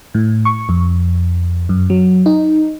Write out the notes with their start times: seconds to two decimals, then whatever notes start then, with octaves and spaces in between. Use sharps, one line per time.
0.15 A2
0.45 C#6
0.69 F2
1.69 F#2
1.90 F#3
2.26 D#4